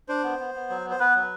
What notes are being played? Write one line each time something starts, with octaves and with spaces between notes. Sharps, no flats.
D4 C5
B3
B3
B3
F#3
B3
C5
B3 B4
F#3